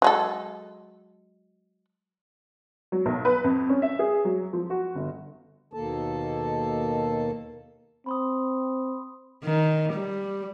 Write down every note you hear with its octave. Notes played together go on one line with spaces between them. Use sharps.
F#3 G#3 A4
F#3
B1
B4
F2
C#4
E5
G#4
F#3
F3
F#4
G1
D#2 B2 D#3 A#3 A4 A5
C4 B5 C6 D#6
D#3
G3